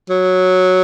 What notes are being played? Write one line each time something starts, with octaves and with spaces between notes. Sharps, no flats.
F#3